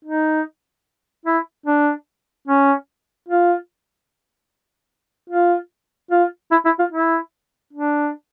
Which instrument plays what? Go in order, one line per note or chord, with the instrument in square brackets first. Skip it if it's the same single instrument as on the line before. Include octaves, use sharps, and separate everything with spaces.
[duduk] D#4
E4
D4
C#4
F4
F4
F4
E4
E4
F4
E4
D4